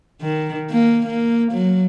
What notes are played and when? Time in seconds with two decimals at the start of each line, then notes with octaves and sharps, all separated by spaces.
0.22 D#3
0.70 A#3
1.06 A#3
1.52 F#3